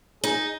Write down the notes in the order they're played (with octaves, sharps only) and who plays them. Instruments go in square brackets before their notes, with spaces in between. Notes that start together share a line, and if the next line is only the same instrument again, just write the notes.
[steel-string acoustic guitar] D#4 [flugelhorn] G#4